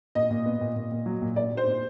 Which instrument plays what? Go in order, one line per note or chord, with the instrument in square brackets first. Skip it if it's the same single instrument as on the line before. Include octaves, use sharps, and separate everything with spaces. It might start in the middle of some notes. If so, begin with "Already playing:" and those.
[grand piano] A#2 [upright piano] D#5
[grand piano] A#2
B3
A#2
A#2
A#2
F#3
A#2
[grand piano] A#2 [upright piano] D5
[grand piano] A#2
[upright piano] C5
[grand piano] A#2